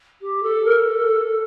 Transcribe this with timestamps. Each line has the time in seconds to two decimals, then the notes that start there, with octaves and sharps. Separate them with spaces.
0.21 G4
0.43 A4
0.65 A#4
0.80 A#4
0.86 A4
1.07 A4